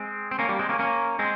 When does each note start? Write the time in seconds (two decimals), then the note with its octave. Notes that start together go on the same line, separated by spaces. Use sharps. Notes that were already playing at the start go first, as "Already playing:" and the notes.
Already playing: G#3 C4
0.31 C4
0.39 A#3 C#4
0.49 G3 A#3
0.59 G#3 C4
0.69 A#3 C#4
0.79 A#3 C#4
1.19 G#3 C4